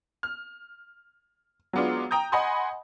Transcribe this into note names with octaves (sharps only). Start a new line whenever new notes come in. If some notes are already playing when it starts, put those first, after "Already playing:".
F6
F#3 G#3 B3 D4 F4
G5 A#5 D#6 G6
D#5 F#5 G#5 B5 C6 D#6